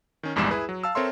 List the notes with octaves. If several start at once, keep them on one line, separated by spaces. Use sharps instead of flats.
D#3 C#4
A#1 E2 G#2 G3 G#3 E7
E4 G#4 B4
F#3
F5 A5 E6
C4 A4 A#4 C#5 E5 C6